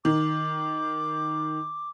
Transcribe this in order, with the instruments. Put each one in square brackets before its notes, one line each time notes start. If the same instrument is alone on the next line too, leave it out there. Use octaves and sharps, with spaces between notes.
[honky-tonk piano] D#3 [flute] D6